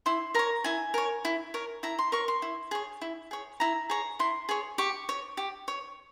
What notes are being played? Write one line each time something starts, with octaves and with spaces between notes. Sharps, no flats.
E4 C6
A#4 C#5 A#5
E4 G#5
A#4 C#5
E4
A#4 C#5
E4 A#5
C6
A#4 C#5 C#6
C6
E4
G#4 C#5
E4
G#4 C#5
E4 A#5
G#4 C#5 A#5
E4 C6
G#4 C#5
G4 C#6
C#5
G4
C#5